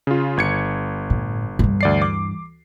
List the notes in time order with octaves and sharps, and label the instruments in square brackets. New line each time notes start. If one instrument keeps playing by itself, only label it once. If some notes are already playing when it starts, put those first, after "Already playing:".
[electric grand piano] C#3 F4
G1 G#6 C#7
[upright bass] A2
G2 E3
[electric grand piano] D2 D5 C7
D6